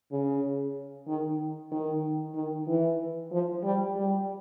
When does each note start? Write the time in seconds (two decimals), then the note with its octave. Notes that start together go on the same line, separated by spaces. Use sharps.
0.12 C#3
1.08 D#3
1.72 D#3
2.35 D#3
2.67 E3
3.32 F3
3.63 G3
3.96 G3